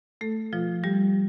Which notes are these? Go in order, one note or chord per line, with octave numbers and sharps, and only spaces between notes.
A3 A4
B2 F3 F4
G3 G4